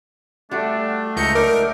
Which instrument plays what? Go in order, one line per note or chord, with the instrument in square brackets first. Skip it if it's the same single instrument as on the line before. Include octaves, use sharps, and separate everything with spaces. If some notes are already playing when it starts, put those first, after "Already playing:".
[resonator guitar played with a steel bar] G3 F#4 [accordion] A3 [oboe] D4
[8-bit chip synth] C#2 G6 C#7 [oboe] D#4
[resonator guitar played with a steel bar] F#3 D4 D#4 [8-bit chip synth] A#4 [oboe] D6